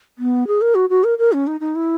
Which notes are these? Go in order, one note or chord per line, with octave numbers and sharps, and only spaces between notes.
B3
G#4
A#4
F#4
F#4
A#4
A#4
C#4
D#4
D#4
E4